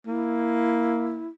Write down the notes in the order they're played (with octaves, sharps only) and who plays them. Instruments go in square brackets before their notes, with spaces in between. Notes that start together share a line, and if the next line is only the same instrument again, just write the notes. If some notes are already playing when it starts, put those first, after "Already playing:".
[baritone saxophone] A#3 [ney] E4